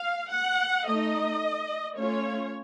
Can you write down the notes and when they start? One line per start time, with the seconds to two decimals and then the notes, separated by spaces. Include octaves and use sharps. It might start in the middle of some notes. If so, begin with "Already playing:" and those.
Already playing: F5
0.31 F#5
0.86 A3 D#4 D#5
1.97 A3 C#4 F4 C#5